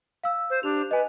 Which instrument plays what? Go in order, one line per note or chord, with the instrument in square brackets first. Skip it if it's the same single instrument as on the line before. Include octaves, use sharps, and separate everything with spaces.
[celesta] F5 E6
[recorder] C5
[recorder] D4 [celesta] G4 F7
[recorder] B4 [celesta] D#5 G#5